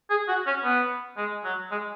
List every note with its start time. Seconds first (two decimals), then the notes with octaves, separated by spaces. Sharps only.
0.10 G#4
0.28 F#4
0.46 C#4
0.64 B3
1.17 G#3
1.44 F#3
1.71 G#3